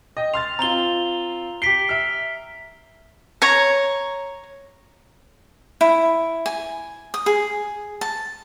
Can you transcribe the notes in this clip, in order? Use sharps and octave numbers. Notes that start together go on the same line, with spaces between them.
D#5 G5
C6 F6 A6 F7
C4 F4 A#5 F7 G7
G4 B6 C7 D7 G7
E5 F6
C#5 A#5
E4
G#5
D#6
G#4
A5